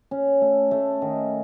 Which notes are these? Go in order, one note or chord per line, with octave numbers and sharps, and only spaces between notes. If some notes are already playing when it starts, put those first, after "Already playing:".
C#4
A3
A3
D#3